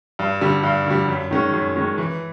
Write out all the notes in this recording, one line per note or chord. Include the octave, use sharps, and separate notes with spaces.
G2
D3 G3
G2
D3 G3
F#2
D#3 G#3 C#4
F#2
D#3 G#3 C#4
E3